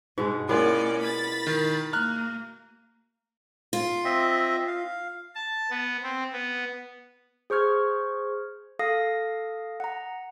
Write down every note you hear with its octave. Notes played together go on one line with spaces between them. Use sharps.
G2 B2 G#3 D#4
A#3 B3 C#4 E4 F4 G#4 A#4 D5
B5 A6
D#3
A#3 A#5 F6 F#6
F4
C4 D#5 E5
F5
A5
B3
C4
B3
G#4 C5 C#6 F6 G#6
A4 F5 D#6 A#6
F#5 A#5